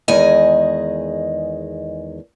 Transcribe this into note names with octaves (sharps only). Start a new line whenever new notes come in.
E2 D#3 G#3 G#4 D#5 G#5